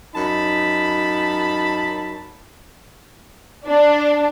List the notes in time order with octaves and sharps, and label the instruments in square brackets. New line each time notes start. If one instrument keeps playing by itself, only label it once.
[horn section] F#2 D#4 A5 B5
[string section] D4